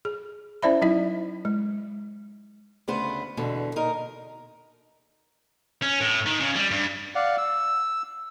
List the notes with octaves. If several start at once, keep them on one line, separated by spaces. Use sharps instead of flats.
G#4
C#4 E4 C5 D5 E5 B5
F#3 D#4 E4 D#5
G#3
D2 C#3 B3 B4 C5
E2 B2 D3
A#2 D#4 A#4
C#4
A2
D#3
C#3
G3
G2
D5 F5 F#5
E6